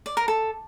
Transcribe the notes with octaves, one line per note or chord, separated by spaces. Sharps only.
D5
A#4
A4